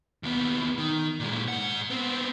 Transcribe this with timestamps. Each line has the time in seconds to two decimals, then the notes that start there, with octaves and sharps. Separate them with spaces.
0.23 D#2 B3
0.78 D#3
1.20 A#2 G#3
1.48 G#2 F#5
1.90 B3 C4